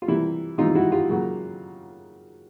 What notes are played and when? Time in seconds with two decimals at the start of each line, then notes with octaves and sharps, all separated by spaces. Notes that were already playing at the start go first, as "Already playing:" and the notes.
0.02 F4
0.08 C3 E3 G3 A#3 E4
0.58 C3 E3 G3 A#3 D#4 F4
0.75 E4 F#4
0.92 F4 G4
1.09 C#3 F#3 A#3